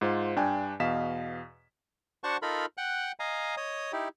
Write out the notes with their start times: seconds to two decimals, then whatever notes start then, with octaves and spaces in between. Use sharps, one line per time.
0.01 G#2 F4 C5 F5
0.36 G2 D4 G5 G#5
0.80 E2 B2 D#5 F5 B6 E7
2.23 D4 F#4 C5 F#5 A5 C#6
2.42 D#4 F4 A4 A#4 B5
2.77 F#5 G5 F#6
3.20 D#5 F5 G#5 A#5
3.57 C#5 D#5 D#6
3.93 D#4 E4 G4